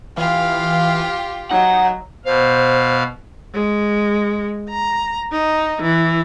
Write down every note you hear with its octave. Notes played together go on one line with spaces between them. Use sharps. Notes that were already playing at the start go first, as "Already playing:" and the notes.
E3 F4 G4 F5
F#3 D#4 F#5
B2 C5 F5
G#3
A#5
D#4
E3